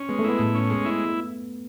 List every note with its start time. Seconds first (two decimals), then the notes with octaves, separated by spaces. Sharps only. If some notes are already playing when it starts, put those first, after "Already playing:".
Already playing: C#4
0.09 G#3 B3
0.19 A3
0.24 B3 E4
0.39 A2
0.55 C#4
0.70 G#3
0.85 E4